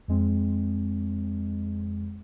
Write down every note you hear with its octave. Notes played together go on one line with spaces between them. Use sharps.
F2 G#3 C4